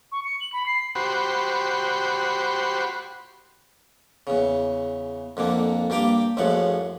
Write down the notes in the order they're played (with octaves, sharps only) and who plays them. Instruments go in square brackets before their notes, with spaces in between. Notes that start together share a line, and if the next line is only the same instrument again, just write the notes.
[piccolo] C#6
C#7
F#7
B5
C7
[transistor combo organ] F#4 G4 C5 B5
[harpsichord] E2 C#3
F2 A#2 D3 A#3
G2 A#3 G4 G5 A#5 D6
A1 F#2 F3 G#3 F#5